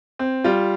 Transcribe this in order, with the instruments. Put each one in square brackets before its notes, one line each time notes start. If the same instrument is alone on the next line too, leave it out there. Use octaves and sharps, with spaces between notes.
[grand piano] C4
G3 F4